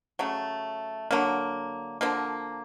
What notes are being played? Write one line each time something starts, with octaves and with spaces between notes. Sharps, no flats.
C#3 F#3 A3
D3 F#3 A#3
D3 F3 A#3